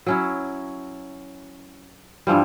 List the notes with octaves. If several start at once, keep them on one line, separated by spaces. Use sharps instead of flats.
F#3 C#4 E4
G2 E3 F3 G3